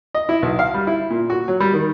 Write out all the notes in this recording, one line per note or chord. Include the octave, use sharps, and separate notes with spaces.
D#5
E4
B1
F5
G3
E4
A#2
F#4
F#3
G3
D#3